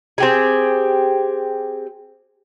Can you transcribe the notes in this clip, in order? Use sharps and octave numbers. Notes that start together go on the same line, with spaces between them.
C4 G4 G#4